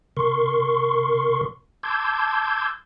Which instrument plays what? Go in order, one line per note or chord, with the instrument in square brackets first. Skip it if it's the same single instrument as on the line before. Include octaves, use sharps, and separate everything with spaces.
[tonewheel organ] C3 A#4 C6 C#6
A5 C6 D6 E6 G6 G#6